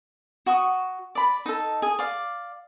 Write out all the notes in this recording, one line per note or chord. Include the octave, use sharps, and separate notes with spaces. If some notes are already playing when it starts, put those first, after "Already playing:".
F#4 C#6 D#6
D5 B5
D#4 A4
G#4
D5 F5